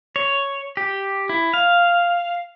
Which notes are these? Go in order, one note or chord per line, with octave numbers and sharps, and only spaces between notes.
C#5
G4
E4
F5